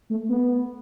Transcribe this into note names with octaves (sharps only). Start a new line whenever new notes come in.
A3
B3